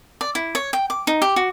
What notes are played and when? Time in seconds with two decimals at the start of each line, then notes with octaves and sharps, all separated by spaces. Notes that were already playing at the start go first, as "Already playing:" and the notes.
0.21 D5
0.35 E4
0.55 C#5
0.73 G5
0.90 D6
1.07 D#4
1.22 G4
1.36 F#4